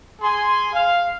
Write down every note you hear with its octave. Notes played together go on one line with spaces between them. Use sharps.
G#4 G#5 C6
F5